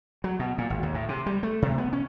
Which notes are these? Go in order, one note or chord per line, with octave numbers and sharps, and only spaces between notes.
F#3
B2
A#2
G#1
D#2
A2
C3
G3
A3
C3
B3
C#4